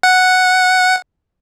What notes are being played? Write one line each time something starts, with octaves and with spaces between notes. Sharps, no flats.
F#5